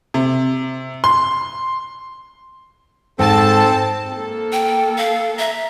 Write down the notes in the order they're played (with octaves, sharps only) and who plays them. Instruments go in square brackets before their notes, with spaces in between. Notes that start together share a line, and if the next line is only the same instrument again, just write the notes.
[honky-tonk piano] C3
C6
[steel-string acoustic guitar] G#2 [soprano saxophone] C4 [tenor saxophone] A4 [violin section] A5
[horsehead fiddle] A#3 A4
[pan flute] G5
F5
[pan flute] E5 [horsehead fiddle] A#5